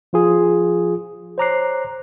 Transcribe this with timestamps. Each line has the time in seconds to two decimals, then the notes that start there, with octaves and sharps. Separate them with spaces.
0.13 F3 F4 G#4
1.38 C5 C#5 A#5 D6 F#6 C7